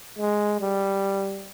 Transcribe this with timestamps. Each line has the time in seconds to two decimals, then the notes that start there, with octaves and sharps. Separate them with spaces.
0.19 G#3
0.60 G3